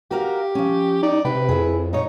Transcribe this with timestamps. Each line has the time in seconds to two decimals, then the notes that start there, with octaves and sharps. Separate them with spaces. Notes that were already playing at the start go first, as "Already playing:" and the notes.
0.11 F#4 G4 A#4 F5
0.55 F3 C#4
1.03 D#4 D5
1.25 C3 B4 G5
1.49 F2 E4 G#4
1.93 A#2 D#4 C#5